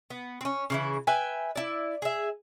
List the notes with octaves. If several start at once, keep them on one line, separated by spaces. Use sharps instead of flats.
B3
C4 C#4
C#3 E3 E4
B4 E5 G5 G#5
E4 D5
G#4 E5